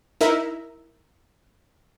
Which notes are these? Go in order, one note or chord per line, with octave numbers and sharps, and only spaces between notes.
D#4 E4 A#4 E5 A#5